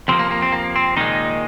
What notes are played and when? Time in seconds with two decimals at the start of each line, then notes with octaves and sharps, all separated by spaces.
0.08 F2 C3 F3 A#3 C4
0.19 A#3
0.31 A#3
0.42 C4
0.52 A#3
0.76 C4
0.97 A#2 D#3 G#3 D#4